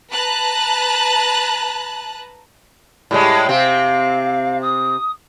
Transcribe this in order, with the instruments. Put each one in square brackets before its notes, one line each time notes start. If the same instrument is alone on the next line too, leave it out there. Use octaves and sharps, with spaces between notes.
[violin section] B4 A5 A#5 F#6
[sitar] A2 G3 G#3
[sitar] C3 C4 [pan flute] F5
[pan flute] D#6